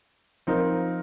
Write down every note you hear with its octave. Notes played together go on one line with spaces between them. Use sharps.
F3 C4 D#4 A#4